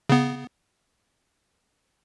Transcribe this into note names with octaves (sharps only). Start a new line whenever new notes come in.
C#3 B3